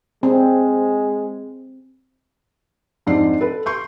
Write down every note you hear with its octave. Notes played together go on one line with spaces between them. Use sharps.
G#3 C4
F2 G#2 D4 C7
A4 B4
C6 C#6 G6